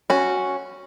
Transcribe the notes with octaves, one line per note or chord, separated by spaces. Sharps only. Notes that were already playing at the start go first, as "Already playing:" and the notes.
C#4 F#4